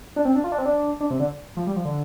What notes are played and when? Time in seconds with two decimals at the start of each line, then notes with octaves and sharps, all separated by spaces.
0.16 D4
0.25 C4
0.35 D4
0.44 F4
0.52 D4
0.58 C4
0.66 D4
1.00 D4
1.10 C3
1.20 D3
1.57 F3
1.67 G3
1.76 F3
1.85 D3